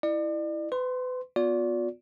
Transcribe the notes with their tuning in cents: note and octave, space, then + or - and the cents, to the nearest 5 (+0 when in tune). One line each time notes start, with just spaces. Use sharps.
E4 +0 D5 +40
B4 +35 C6 +0
B3 +0 F4 +45 D5 -25